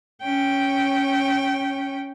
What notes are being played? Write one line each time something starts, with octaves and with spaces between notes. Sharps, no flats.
C#4 G5